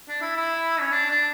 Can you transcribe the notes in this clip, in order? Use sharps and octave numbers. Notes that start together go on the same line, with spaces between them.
D4
E4
E4
C#4
D4
D4